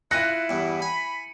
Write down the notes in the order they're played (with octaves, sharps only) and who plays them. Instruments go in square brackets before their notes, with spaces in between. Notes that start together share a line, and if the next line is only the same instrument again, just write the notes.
[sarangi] E4 [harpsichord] F4 [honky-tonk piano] F#6 A#6 [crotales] C#7 D#7
[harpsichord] E2 G2
[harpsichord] G#5 [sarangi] B5